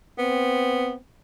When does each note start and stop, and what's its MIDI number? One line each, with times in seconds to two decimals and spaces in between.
0.18 0.95 59
0.18 0.96 60